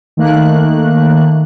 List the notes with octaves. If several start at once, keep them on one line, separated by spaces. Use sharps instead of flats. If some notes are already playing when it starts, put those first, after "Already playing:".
D#3 A3 A#3 F#6